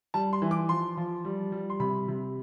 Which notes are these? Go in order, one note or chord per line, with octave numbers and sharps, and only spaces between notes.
G3 A5
C6
E3
D6
F3 C6
F3
G3
G3
C6
C3 B5
C3